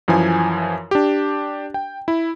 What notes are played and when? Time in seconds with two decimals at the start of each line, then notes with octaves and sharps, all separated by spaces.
0.08 F#2 E3 F3 G#5
0.91 D4 G4
1.74 G5
2.08 E4